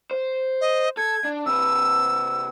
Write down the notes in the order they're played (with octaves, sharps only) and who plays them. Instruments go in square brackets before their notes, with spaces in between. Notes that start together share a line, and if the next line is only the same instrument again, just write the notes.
[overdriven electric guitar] C5
[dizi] D#5
[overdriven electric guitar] A4 [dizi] G#6
[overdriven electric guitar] D4
[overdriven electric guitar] C3 B4 [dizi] E6